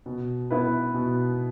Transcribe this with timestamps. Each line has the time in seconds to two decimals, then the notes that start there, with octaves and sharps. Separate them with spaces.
0.06 B2
0.50 B3 E4 B4
0.94 B2